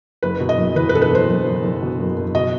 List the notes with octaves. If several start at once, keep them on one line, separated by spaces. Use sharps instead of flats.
F#1 B4
B2
D#5
F#1
E2 B4
B4
B2 A4
B4
F#1 C5
F#1
F#1
F#1
B2
F#1
F#1
B2 D#5